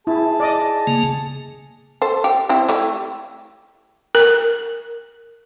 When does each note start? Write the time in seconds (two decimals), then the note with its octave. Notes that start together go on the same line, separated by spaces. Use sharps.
0.07 E4 G#4 A5
0.40 D5 D#5
0.87 C#3 A#3
2.02 A4 C5
2.24 G4
2.49 C4 E4
2.68 A3 E4 G4
4.15 A#4